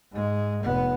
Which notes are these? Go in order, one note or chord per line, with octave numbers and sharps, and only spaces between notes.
G#2 G#3
F1 B3